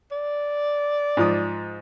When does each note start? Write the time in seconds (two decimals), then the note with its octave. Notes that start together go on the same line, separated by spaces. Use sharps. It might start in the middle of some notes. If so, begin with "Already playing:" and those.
0.11 D5
1.17 G#2 F3 D#6